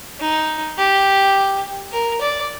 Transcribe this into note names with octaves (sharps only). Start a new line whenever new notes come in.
D#4
G4
A#4
D5